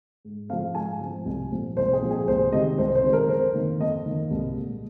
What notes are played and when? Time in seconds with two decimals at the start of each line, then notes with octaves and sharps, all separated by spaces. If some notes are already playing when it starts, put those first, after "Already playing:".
0.25 G#2
0.49 F3 G#3 C4 F5
0.75 G#2 G#5
1.01 F3 G#3 C4
1.25 C2
1.52 A#2 F3 C4
1.77 C2 C5
1.93 G#4
2.02 A#2 F3 C4
2.11 G#4
2.28 C2 C5
2.53 C3 D#3 G#3 D#5
2.78 C2 C5
2.95 C5
3.03 C3 D#3 G#3
3.13 A#4
3.29 F2 C5
3.54 D#3 A#3
3.80 F2 D#5
4.06 D#3 A#3
4.31 C2
4.56 A#2 G#3